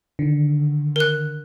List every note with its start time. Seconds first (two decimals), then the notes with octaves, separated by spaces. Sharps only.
0.19 D3 D#3
0.96 A#4 F#6